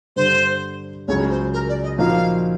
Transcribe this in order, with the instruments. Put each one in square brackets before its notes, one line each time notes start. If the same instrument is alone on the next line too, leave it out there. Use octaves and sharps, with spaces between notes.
[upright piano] G2 D3 G3 [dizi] C5
[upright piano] C#2 C#3 F#3 [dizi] C#5
[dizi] C5
A#4
D5
D#5
[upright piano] A#2 F3 A#3 D#4 F#4 [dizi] F5